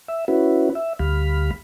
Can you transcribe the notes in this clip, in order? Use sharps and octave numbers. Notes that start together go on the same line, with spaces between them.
E5
C#4 E4 F#4 B4
E5
D2 G3 F5 B5